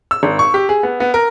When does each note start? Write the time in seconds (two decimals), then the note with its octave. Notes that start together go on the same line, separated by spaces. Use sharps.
0.11 E6
0.23 G#1
0.39 C#6
0.54 G4
0.69 G#4
0.83 B3
1.00 B3
1.14 A#4